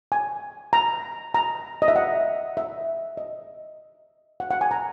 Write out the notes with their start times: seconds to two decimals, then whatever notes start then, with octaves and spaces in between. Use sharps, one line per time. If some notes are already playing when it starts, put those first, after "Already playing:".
0.12 G#5
0.73 A#5
1.34 A#5
1.82 D#5
1.88 E5
1.96 F#5
2.57 E5
3.17 D#5
4.40 F#5
4.51 F#5
4.61 G#5
4.71 A#5